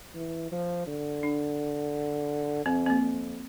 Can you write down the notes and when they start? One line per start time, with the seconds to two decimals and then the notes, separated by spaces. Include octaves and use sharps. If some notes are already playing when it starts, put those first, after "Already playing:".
0.15 E3
0.52 F3
0.87 D3
1.23 D4
2.66 F2 C4
2.86 C4
2.90 A#3
3.02 F2